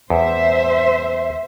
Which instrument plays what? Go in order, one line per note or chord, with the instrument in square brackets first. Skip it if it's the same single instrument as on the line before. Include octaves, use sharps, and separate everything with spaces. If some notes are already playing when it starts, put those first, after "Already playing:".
[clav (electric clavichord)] E2 [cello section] C5 E5